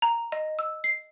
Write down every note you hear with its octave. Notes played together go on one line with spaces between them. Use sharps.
A#5
D#5
E6
C7